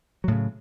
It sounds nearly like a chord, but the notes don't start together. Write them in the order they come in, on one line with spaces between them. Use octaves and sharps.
F#3 A2 C#3